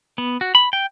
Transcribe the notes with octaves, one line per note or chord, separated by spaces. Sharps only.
B3
F#4
B5
G5